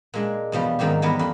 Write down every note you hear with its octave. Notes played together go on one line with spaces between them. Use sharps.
A#2 G#3 D4
E2 B2 F3 G3
G#2 D#3 F#3 C4 G4
E3 G3 B3 A#4
F2 B5 C6